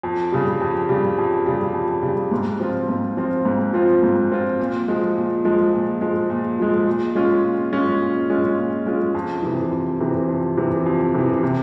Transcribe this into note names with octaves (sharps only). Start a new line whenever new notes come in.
F2
C#3 G3
F2
C#3 G3
F2
C#3 G3
F2
C#3 G3
G#2
F3 C4 F4
G#2
F3 C4 F4
G#2
F3 C4 F4
G#2
F3 C4 F4
A#2
F3 G#3
A#2
F3 G#3
A#2
F3 G#3
A#2
F3 G#3
A#2
G#3 C#4 F4
A#2
G#3 C#4 F4
A#2
G#3 C#4 F4
A#2
G#3 C#4 F4
F2
C3 E3
F2
C3 E3
F2
C3 E3
F2
C3 E3
C3